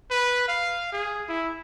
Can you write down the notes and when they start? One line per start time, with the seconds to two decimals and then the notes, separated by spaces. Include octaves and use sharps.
0.11 B4
0.48 F5
0.92 G#4
1.29 E4